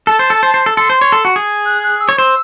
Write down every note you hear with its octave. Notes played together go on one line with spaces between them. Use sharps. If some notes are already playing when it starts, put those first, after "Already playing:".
A4 A5
C5
A4
C5
C5
A4
A4 C6
C5
C#5
A4
F#4
G#4
F#6
F#6
E6
C#5
C5 E6